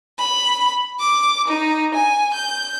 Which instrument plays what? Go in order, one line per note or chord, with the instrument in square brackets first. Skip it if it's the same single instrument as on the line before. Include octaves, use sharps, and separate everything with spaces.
[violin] B5
D6
D#4
G#5
G6